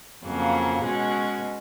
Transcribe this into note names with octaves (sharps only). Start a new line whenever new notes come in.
F2 C#3 F#3 A#3
B2 G#3 C#4 F#4